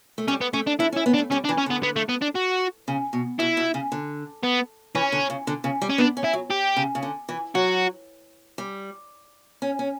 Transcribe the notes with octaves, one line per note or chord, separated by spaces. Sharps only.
A3
G3 C#4
B3
A3 C#4
D4
D4 E4
C#4
E4
B3
D4
A3
G3 C#4
D4
E3
C#4
D3 B3
B3
A3
B3
D4
F#4
C#3
B2
B2 E4
B2
C#3
D3
B3
E3 C#4
D3
C#3
D3
C#3
G3
C#4
B3 D4
C#4
E4
F#3
G4
C#3
C#3
D3
E3
F#3 F#4
G3
C#4
C#4